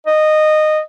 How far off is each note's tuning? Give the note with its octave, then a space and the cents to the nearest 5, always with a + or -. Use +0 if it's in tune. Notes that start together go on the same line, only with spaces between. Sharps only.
D#5 -15